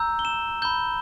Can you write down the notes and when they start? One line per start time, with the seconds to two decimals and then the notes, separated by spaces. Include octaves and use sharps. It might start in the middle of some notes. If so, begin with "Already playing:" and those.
Already playing: A#5 E6 G6
0.19 G7
0.25 E7
0.62 B5 G6 G7